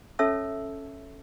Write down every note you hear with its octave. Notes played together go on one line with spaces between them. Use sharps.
C#4 A4 C#5 E5 A5 E6